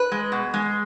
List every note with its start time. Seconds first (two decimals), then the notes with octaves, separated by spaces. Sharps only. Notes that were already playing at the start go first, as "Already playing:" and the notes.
Already playing: B4
0.12 G#3
0.32 B2
0.54 G#3